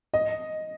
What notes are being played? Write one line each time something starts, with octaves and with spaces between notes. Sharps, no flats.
D#5